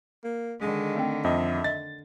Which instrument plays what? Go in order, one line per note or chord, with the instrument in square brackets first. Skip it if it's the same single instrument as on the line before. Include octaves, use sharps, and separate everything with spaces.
[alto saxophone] A#3
[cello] D3 D#3 [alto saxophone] G#3
[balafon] A3 C4 G5
[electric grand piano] F2 D#5 [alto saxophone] E5
[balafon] D#5 [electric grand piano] A6